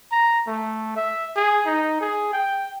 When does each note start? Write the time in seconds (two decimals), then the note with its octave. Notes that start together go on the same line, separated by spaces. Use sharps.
0.12 A#5
0.47 A3
0.96 E5
1.36 G#4
1.66 D#4
2.00 G#4
2.33 G5